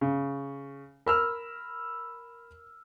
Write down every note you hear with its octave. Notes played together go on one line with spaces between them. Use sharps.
C#3
A#4 B5 E6 F6